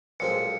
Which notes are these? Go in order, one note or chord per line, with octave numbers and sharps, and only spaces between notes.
B1 A#2 F3 G#3 C4 C#7